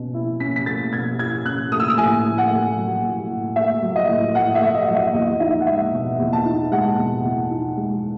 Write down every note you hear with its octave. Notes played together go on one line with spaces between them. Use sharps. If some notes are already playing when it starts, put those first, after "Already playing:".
Already playing: B2 C#4
E4
C#4 B6
B6
A3 A6
B2 G#6
E4 G#6
C#4 F#6
A3 D#6
E6
D#6
A2 G#5
A2
F#5
A3
F#3
A2
A2
A3 E5
F#3
D#5
A2
A2 F#5
E5
A3
D#5
F#3
E5
E2 D#5
D#4 E5
F#5
G#3 E5
B2
E2
A5
D#4
G#3 F#5
B2
E2
D#4
G#3